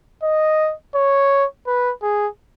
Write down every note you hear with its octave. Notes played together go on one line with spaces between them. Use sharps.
D#5
C#5
B4
G#4